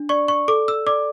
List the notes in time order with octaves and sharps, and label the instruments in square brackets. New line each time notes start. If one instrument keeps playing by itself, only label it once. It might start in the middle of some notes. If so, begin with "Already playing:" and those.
Already playing: [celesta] D4
D5 C#6
C#6
A4 D6
E6
D5 D6